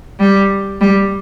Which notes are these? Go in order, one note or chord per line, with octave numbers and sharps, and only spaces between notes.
G3
G3